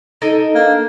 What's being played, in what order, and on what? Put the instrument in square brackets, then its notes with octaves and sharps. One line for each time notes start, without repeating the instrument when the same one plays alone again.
[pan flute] D#4 [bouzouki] A4 A#4 D#5
[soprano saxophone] A#3 [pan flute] D4